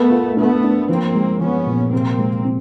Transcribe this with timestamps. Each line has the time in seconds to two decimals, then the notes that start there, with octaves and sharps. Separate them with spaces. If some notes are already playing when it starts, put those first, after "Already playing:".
Already playing: A3 B3 A#4
0.10 F4
0.36 A3 B3 D4
0.63 D4
0.89 F3 A#3 C4
1.15 G#3
1.41 F3 B3 C#4
1.67 A#2
1.92 C3 A#3 C4
2.18 G#3
2.44 C4